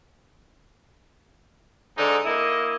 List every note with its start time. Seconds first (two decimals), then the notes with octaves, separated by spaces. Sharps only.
1.96 G#2 D3 D#4
2.25 A#3 E4 D#5